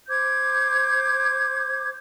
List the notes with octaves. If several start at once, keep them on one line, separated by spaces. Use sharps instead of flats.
C5 D6 G6 G#6